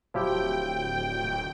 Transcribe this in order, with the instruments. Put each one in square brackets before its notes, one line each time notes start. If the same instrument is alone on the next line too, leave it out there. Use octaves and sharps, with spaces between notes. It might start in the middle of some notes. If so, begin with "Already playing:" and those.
[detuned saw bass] D1 [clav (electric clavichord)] F3 E4 G4 [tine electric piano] F#3 [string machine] G5